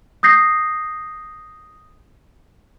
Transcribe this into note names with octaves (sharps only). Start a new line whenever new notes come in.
D#6 G6 A#6 C7